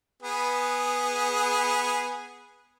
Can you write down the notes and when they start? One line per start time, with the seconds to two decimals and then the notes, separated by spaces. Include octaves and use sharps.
0.23 B3 G#4 B4